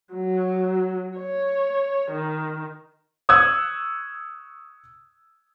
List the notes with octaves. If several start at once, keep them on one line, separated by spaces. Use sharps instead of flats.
F#3
C#5
D#3
C#6 D#6 E6 F#6 G#6